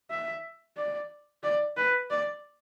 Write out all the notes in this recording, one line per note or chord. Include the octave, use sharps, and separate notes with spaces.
E5
D5
D5
B4
D5